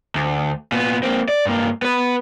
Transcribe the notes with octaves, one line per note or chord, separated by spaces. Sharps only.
D2
A#2 B3
A#3 C4
D5
G2 A#3
B3 B4